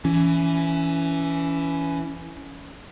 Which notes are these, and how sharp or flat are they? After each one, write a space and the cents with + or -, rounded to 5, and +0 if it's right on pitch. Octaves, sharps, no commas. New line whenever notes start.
E3 +10 C#4 +15